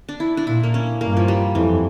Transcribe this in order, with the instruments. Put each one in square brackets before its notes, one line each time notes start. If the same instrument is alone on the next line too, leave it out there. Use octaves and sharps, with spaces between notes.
[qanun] D4
E4
D4
[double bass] A#2 [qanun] E4
[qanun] A#3
C#4
[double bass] G2 [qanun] A#3
[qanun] F3
G3
[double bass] F2 [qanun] E3